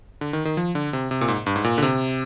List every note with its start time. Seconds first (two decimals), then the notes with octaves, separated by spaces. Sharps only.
0.21 D3
0.33 D#3
0.45 D#3
0.57 F3
0.75 D3
0.93 C3
1.11 C3
1.21 A#2
1.28 G#2
1.46 G2
1.56 G#2
1.64 A#2
1.78 D3
1.82 C3